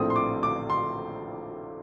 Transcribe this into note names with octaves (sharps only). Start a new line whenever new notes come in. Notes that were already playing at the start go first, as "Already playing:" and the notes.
Already playing: A#1 A2 A3 C4 D#6
C6
D6
D6
C6